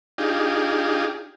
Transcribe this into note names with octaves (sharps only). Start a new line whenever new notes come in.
D4 D#4 F4 G4 G#4